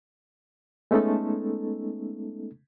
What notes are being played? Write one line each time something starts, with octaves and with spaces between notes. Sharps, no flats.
G#3 A3 B3 C#4 D#4 A4